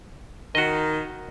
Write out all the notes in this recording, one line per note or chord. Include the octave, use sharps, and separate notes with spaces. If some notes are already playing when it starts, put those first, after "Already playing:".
D#3 F#4 D#5